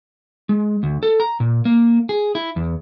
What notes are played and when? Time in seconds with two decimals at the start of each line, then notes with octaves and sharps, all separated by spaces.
0.49 G#3
0.83 D2
1.03 A4
1.20 A#5
1.40 A#2
1.65 A#3
2.09 G#4
2.35 E4
2.56 E2